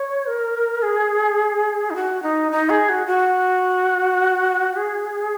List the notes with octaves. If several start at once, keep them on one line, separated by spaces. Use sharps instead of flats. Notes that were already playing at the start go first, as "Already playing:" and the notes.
Already playing: C#5
A#4
G#4
D#4
F#4
D#4
D#4
G#4
F#4
F#4
G#4